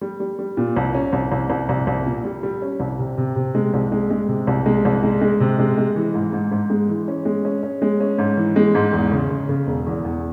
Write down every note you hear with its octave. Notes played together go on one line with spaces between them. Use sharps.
G3
G3
G3
A#2
C2
C#4
C2
C2
C2
C2
C2
A#2
G3
G3
C#4
C2
C3
C3
C3
G#3
C2
G#3
G#3
C3
C2
G#3
C2
G#3
G#3
C3
G#3
G#3
E3
G#2
G#2
G#2
G#3
E3
C#4
G#3
C#4
C#4
G#3
C#4
G#2
E3
G#3
G#2
E2
C#3
C#3
C#3
E1
E2
E2